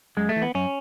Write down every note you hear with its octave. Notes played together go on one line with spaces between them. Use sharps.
F#2 G#3
A3
E3
B3
F#2 C#4